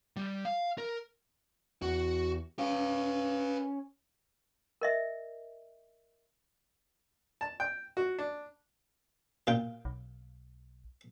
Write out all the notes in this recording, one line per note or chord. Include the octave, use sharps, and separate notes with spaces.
G3
F5
A#4
E2 F#4
C#4 B4 F5
A#4 D#5 E5
A5
G5
F#4
D4
A#2 F4 G5
B1